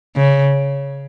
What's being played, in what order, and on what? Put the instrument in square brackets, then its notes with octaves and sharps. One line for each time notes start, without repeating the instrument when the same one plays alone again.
[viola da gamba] C#3